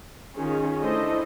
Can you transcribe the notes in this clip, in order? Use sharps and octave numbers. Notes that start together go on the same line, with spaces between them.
D#3 C#4 F4 G#4
A3 D4 E4 A4 C5 D#5